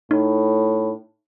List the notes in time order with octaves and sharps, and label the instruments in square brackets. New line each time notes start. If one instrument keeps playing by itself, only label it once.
[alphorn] A2 [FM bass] D#4